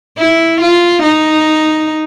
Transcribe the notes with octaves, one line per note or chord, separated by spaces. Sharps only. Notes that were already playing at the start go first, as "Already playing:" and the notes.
E4
F4
D#4